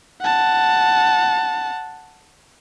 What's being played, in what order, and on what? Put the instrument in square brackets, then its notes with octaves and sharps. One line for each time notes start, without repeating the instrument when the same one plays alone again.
[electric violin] F#5 A5